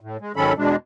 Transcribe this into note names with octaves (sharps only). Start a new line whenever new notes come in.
A2
G#3
G#2 D#3 F#3 C#4 A4 B5
E2 B2 G#3 D4